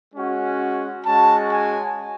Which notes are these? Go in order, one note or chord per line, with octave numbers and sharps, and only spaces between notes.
G#3 C#4 F#4
G#3 C#4 F#4 A5
G#5